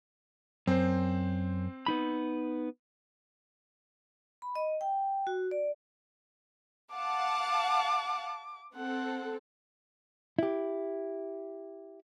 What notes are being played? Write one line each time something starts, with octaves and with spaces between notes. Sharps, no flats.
F#2 C4 C5
B3 D#4 B5
B5
D#5
G5
F#4
D5
F5 F#5 A5 D6
C4 A4 F#5
E4 G4